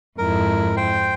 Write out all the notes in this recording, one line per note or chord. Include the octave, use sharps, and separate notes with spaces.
F2 G#2 E4 A#4
C5 G5